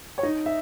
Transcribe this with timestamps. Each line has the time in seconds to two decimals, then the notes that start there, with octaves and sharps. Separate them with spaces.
0.18 C#5
0.23 D#4 D#5
0.46 E5